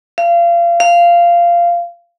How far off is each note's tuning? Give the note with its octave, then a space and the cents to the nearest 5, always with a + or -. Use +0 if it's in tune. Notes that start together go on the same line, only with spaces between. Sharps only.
F5 -30
F5 -15